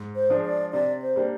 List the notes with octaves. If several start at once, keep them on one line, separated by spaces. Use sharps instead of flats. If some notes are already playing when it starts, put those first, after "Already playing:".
Already playing: G#2
C5
F3 G#3 D4
D5
C3 D5
C5
G3 A#3 D4